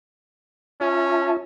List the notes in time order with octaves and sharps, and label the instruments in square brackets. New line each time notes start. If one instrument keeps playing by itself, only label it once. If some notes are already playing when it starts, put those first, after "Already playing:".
[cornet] C#4 [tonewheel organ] F4 E5 A5